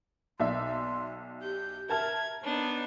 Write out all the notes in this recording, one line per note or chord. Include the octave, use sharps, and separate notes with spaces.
B1 D5 E5 C6
G4 G6
A#4 E5 A5 F6 G#6
B3 D4 D#4 C#5